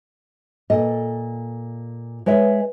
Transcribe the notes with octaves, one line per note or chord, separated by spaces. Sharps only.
A#2 A4 D#5
G#3 B4 C#5 E5